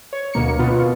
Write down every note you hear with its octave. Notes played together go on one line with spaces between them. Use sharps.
C#5
D2 B2 A#3 C#7
B2 B3 F4